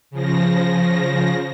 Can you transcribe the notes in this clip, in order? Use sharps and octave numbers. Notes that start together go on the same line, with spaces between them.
C#3 F3 A#6